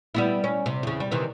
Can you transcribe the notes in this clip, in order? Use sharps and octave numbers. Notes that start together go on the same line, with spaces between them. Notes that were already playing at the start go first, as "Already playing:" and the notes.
G3 B3 E4
C#4
C3
E2 C#3
G3
C3 D#3 E3